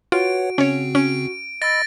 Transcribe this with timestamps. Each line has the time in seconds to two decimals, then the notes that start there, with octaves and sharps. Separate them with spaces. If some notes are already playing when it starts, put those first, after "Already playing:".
0.12 F4 F#4 B4 C#5 F#5 D7
0.58 C#3 C4 C#4 C#5
0.95 C#4 D7
1.62 D#5 B5 E6 A6 A#6 D7